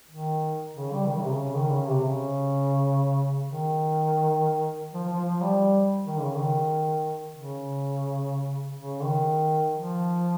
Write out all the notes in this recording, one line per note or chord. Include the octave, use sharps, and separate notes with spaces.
D#3
C#3
G3
D#3
C#3
C3
C#3
D#3
C#3
C3
C#3
D#3
F3
F3
F3
G3
D#3
C#3
D#3
C#3
C#3
D#3
F3